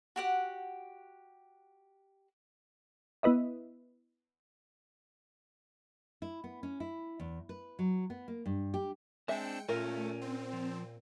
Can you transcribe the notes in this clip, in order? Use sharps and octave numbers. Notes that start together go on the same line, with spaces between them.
F#4 G4 F#5
B3 E4 B4 D#5 E5
E4
B3
C#4
E4
E2
B4
F#3
B3
A#3
G2
G4
G#3 C4 D4 E5 G5 C#7
A#2 A3 C#4 F4 A#4
C4
F3